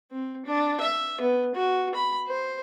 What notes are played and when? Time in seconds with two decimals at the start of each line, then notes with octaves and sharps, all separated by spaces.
0.11 C4
0.46 D4
0.81 E5
1.21 B3
1.55 F#4
1.95 B5
2.27 C5